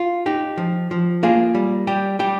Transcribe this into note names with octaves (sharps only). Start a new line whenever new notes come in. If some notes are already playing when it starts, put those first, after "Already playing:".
Already playing: F4
D#4 G4
F3
F3
A#3 F4 G#4
G3
G3 G4
G3 G4